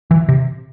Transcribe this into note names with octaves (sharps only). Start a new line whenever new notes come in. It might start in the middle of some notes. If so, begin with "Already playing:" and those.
E3
C3